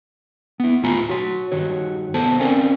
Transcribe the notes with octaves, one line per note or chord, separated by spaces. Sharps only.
B3 E4
D#2 A2 F4 G#5 A#5 B5
F#4 C#5 C6
G2 D#3 F#4 C#5
C2 B3 A4 C5 A5
C4 C#4 A#4 D5 F5 G#5